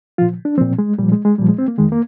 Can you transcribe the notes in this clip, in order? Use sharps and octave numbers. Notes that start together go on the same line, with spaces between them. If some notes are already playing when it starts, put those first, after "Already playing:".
A#2 F3 F4
D4
A#2 F3 C4
G#3
A#2 F3 G3
G#3
G#3
A#2 F3 G3
G#3
C4
A#3
F2 D#3 G#3
A#3